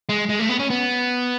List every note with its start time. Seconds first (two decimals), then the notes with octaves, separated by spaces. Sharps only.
0.09 G#3
0.29 G#3
0.39 A3
0.49 B3
0.59 C#4
0.70 B3